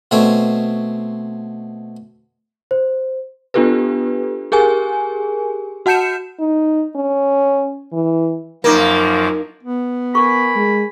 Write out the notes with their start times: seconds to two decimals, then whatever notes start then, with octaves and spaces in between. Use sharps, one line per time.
0.11 B2 A3 C4 C#5
2.71 C5
3.54 B3 D4 F4 G4 A4 B4
4.52 G4 G#4 A#4 G#5
5.86 F#4 F#5 A5 G6 C#7 E7
6.40 D#4
6.96 C#4
7.93 E3
8.64 F#2 F3 A#3 D#4 A#4
9.63 B3
10.15 A#4 G#5 B5 C#6
10.56 G#3